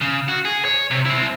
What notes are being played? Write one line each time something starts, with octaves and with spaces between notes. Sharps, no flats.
C#3
F#4
G#4
C#5
C3
C4 E4